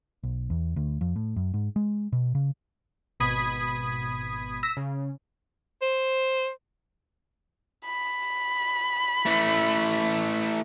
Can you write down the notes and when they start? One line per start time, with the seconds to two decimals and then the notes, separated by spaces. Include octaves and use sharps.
0.23 B1
0.50 E2
0.76 D2
1.01 F2
1.16 A2
1.36 F#2
1.54 G#2
1.76 G#3
2.13 B2
2.35 C#3
3.20 G#1 B2 B5 D#6 G#6 B6
4.63 E6 A#6 B6
4.77 C#3
5.82 C5
7.85 B5
9.26 E3 A3